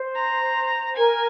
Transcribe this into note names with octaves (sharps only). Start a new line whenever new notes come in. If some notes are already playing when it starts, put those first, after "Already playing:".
Already playing: C5
A#5
A#4 G#5